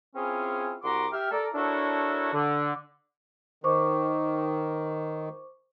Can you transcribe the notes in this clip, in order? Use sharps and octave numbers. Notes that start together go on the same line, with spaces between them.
C4 C#4 E4 F4 G#4
C2 F#4 A#5 C6 D6
G4 E5 F6
A4 A#4 D5
D4 E4 F#4 A4 A#4 C#5
D3
D#3 C5 C#6 D6